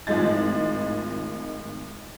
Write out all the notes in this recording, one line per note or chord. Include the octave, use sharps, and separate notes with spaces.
G#1 A2 F3 G#3 D#4 A6